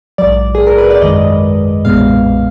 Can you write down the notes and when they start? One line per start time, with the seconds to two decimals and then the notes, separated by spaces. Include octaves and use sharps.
0.18 A#1 G#2 F#3 D5
0.55 G#4
0.67 A#4
0.78 B4
0.90 D5
1.02 F#2 D#3 G#3 D#5
1.85 B1 A#2 G#3 B3 F5